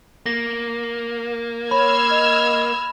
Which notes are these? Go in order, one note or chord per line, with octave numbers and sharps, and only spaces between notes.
A#3 A#6
C#5 B5 E6 F6 G#6
D#5